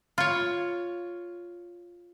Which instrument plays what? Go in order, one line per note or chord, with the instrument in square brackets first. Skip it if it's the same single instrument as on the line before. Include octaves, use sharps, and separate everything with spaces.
[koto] F4 C#5